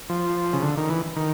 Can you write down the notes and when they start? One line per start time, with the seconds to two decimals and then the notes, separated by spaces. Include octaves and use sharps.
0.09 F3
0.53 C#3
0.63 D3
0.77 D#3
0.89 E3
1.16 D#3